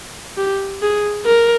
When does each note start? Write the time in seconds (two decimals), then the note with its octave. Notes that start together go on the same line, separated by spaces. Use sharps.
0.38 G4
0.82 G#4
1.26 A#4